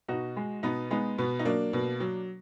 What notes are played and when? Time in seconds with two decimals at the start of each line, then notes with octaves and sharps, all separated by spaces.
0.08 B2 D#4 F#4
0.36 G#3
0.63 B2 B3 D#4
0.91 G#3 B3 D#4
1.18 B2 B3
1.39 D#4
1.45 F#3 A#3 D4
1.73 B2
2.00 F#3